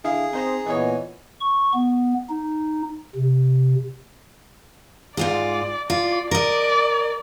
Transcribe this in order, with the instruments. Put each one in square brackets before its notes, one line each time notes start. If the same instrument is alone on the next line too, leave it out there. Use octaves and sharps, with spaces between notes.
[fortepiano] D3 E4 F5 [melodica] G#4
[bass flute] C4 [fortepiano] D#4 C5 A#5
[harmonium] A#2 B3 G#5 [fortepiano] E3 C#5 [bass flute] D#5
[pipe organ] C#6
B3
D#4
C3
[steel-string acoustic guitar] G#2 F4 G#4 [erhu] D5
[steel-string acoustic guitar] F4 [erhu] D5
[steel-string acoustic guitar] A#4 D#5 [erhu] D5